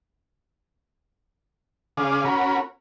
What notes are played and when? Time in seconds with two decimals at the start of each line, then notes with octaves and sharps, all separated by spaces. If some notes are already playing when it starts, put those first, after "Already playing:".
1.97 C#3 G#4 D5 F5
2.25 C#4 F#4 A#4 B5